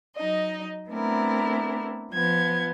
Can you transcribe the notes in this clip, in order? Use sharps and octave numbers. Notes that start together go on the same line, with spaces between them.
F#3 D#4 D#5
A3 B3 C4 D4 E4 A#4
F3 B3 G#6